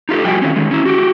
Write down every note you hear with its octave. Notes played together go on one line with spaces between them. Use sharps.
D#4 F4 G4 A4
F3 G3 F#4 G5 G#5
D#3 F3 C4 C#4
D#3 G#3
C#4 E4
F#4 G4